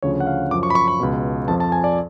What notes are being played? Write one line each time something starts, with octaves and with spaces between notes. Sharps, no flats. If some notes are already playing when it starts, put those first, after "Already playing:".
D2 C#3 F3 C#5
F#5
F5
F#2 F3 D6
C#6
B5
C#6
B5
C#2 B2
F2 F3 A5
A5
G#5
D5